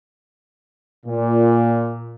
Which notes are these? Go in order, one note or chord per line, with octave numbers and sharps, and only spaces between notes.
A#2